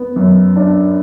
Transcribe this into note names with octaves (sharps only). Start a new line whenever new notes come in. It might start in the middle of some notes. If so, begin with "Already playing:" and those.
Already playing: B3
F#2
D4